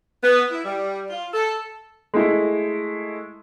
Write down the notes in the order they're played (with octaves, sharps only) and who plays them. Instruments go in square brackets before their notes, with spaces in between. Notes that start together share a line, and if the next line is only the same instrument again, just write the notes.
[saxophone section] B3
E4
G3
F4
A4
[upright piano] G#3 A3 E4